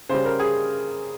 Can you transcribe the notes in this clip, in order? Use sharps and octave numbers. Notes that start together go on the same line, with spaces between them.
C#3 G3 C5
A#4
G#4